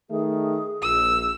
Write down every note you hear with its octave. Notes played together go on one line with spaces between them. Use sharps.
D#3 A3 G#4
A#1 E6